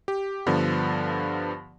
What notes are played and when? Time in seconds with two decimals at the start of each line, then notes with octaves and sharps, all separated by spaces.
0.08 G4
0.46 G2 D3 F3 B3